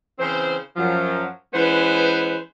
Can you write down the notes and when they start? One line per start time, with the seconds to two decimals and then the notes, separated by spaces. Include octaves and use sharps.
0.18 C#3 E3 C4 C5
0.76 F#2 F3 F#3
1.53 E3 G#3 B3 C#4 B4 C5